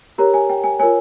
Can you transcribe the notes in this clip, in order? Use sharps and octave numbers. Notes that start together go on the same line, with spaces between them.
G4 A#4 C#5 A#5
G#5
G5
G#5
F4 A#4 C#5 G#5